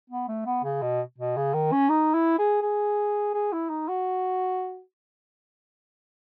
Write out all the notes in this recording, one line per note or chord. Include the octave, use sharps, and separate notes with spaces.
B3
A3
B3
C#3
B2
B2
C#3
D#3
C#4
D#4
E4
G#4
G#4
G#4
E4
D#4
F#4